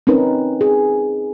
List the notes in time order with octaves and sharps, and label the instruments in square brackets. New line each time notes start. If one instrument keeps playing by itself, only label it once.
[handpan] C4 C#4 D#4 A#4 B4
G#4